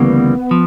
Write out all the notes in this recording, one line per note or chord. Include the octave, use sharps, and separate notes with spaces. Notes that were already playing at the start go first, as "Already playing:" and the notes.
Already playing: D2 C#3 E3 G3 A#3 B3
F3